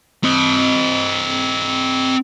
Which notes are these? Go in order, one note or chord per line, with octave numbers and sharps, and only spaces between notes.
C4 D#5